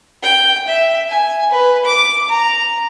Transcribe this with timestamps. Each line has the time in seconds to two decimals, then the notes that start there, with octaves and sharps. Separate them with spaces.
0.23 G5
0.68 E5
1.08 G#5
1.51 B4
1.85 D6
2.28 A#5